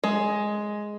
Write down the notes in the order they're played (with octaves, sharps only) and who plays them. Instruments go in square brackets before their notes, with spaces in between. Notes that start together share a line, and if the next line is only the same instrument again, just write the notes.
[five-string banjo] G#3